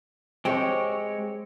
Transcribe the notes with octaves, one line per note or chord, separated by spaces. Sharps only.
G#3 C4 G4 C#5